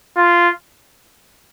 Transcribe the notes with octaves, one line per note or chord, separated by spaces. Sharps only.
F4